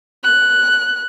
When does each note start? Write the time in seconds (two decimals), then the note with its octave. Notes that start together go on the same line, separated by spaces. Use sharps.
0.24 F#6